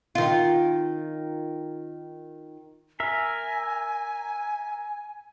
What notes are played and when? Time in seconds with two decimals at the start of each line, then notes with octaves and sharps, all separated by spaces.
0.15 D#3 F4
3.00 A#4 E5 G#5